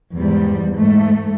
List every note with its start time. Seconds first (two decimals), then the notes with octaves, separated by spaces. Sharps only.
0.14 E2 G#2 G3
0.77 G#2 A3